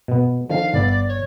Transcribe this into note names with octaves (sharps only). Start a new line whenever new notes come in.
B2 B3
D3 D#3 F3 F5
G1 B3 D5 E5
C#5